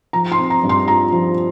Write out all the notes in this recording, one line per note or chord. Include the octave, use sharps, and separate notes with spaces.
F3 A#5
C6
C4
A#5
G2
C6
F4 A#5
F3